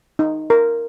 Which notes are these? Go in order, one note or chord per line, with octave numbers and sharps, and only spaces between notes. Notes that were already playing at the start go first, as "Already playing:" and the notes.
D#4
A#4